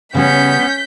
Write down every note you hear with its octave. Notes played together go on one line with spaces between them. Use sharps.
C#3 G3 B3 C#4 G6 B6